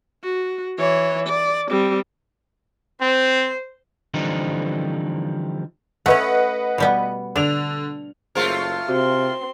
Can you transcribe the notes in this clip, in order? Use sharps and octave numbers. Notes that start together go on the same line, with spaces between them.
F#4
E3 C#5
D5
G3 C4
C4 C5
D3 E3 F3 G3 C4 D#4
A3 C#4 B4 D#5 F#5
B2 G3 B3
D3 D4 F7
F#1 A3 F4 G#4 A#4 C5
C3 C4 F#4 C6